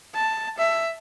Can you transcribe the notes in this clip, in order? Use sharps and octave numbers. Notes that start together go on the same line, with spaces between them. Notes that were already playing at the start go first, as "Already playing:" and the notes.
A5
E5